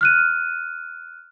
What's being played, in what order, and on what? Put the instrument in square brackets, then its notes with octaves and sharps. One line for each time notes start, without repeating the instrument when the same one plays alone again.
[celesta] F6 F#6 D#7